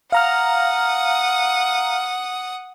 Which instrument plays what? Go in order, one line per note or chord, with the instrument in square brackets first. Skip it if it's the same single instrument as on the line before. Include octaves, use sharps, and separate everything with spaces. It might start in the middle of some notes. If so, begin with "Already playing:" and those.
[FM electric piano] F5 A#5 F6 [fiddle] F#5 D#6